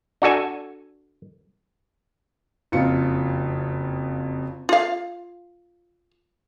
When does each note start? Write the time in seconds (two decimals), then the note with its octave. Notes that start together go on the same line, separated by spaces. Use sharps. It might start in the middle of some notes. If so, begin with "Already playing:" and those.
0.22 D4 F#4 A4 G#5
2.72 F#1 F2 F4 C#7
4.69 F4 F5